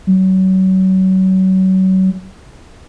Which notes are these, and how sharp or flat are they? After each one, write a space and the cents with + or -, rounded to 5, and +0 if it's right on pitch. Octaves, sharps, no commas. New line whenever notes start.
F#3 +30